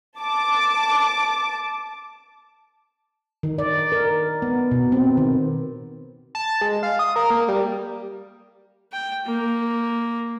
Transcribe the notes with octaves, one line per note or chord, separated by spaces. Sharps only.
A5 D6
D#3
D5
A#4
B3
B2
C4
D#3
A5
G#3
F5
D#6
A#4
A#3
G3
G5
A#3